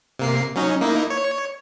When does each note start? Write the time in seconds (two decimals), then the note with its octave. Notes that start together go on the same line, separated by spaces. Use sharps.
0.19 C3 A#3 C7
0.56 F#3 C#4 D#4
0.81 A#3 D#4 E4
1.10 C#5